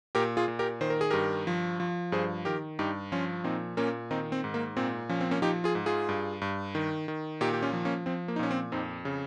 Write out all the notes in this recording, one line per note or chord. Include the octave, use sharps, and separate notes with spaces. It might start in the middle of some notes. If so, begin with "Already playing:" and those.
A#2 G4 A#4
F4 G#4
A#2
G4 A#4
D#3 C5
A#4
G#4
G2 G4 A#4
F3
F3
G2 G#4 C5
D#3 G4 A#4
G2 D#4 G4
F3 C#4 F4
A#2 C4 D#4
A#2 A#3 C#4
D#3 C4 D#4
C4
G#2
A#3
A#2 C4
F3 C#4
C4
A#3 C#4
F3 D#4 G4
F4 G#4
G#2
F4 G#4
G2
G2
D#3
D#3
A#2 D#4 G4
G4
C#4 F4
F3
A#3 C#4
F3 C4
A#3
D#4
A#2 C#4
C4
F2 C4 D#4
C#3